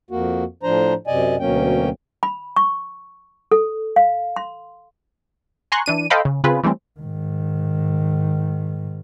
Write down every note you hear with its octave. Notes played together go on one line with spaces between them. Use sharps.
F2 A#3 F#4
A2 F3 D4 C5 A#5
F#2 C3 D5 D#5 G#5
D2 B2 F#3 A#3 C#4 G5
B5
C#6
A4
F5
C6
G#5 A#5 C6 C#6 F#6
E3 D4 D#7
A4 C5 D#5 F5 G5 B5
C#3
C#3 C4 F4 G#4 B4
E3 G3 A3 C4 C#4
G#2 D#3